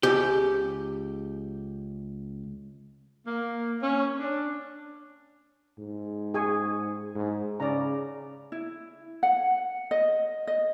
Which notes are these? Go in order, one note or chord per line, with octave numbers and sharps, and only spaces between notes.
C#2 G4
A#3
C#4
D4
G#2
G#4 G#5 C#6
G#2
C#3 D5 A#5
E4
F#5
D#5
D#5